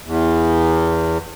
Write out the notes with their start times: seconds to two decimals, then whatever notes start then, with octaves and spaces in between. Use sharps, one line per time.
0.05 E2